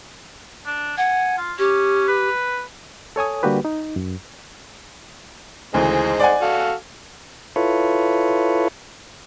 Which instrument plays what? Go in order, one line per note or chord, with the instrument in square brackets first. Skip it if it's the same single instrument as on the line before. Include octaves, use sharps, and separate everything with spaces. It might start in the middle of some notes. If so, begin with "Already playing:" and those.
[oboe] D4
[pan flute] F#5 [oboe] G#5
[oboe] F4
[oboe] C#4 [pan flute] G4
[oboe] B4
[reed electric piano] A4 C#5 G#5 D#6
D3 G3 A#3 F#4 G4 B4
D#4
F#2
[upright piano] D2 C#3 E3 [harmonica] G#3 D#4 C5
[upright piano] D5 F#5 G#5
[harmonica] F#4 A4 F5
[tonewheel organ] E4 F4 A4 B4 C#5